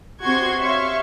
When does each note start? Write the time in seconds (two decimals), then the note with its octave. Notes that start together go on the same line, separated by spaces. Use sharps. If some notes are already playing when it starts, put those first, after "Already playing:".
0.23 C3 F#4 C6 C#6 G#6
0.59 C#5 E5 F5 C6 C#6